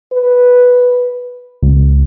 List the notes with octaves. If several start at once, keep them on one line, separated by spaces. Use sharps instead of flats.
B4
C#2